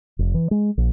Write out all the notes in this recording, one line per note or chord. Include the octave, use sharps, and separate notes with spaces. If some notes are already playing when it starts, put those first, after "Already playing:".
F1
E3
G#3
A#1